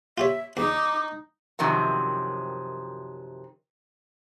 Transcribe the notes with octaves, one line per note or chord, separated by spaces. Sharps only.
F4 G4 C#5 E5
E2 D#4 D6
F#2 C3 D#3 F3 F#3